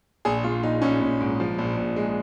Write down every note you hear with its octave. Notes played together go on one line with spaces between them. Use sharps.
A#1 G#4
A#1 F4
A#1 D#4
A#1 C#4
A#1
G#2
F3
A#1
A#1
G#3